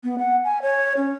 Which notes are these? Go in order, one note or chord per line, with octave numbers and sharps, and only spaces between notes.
B3
F#5
G#5
C#5
C#4